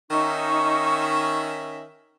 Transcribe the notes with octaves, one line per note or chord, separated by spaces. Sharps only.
D#3 C#4 D#4 E5 C#6